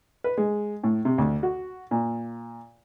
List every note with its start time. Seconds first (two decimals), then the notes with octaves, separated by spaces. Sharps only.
0.24 B4
0.38 G#3
0.83 A2
1.05 C3
1.18 D2
1.43 F#4
1.91 A#2